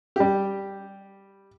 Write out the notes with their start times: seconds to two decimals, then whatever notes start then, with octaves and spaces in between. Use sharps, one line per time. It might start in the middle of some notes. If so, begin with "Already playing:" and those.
0.16 G3 G4